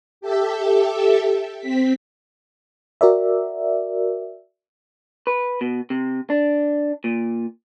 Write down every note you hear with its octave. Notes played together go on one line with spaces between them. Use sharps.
G4 A4 E5
C4 B6
F#4 A#4 D5 E5
B4
B2
C3
D4
A#2